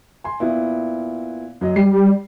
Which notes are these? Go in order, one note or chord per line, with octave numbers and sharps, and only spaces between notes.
G#5 C6
A#2 B3 E4
F#2 F#3 D#5
G3 C7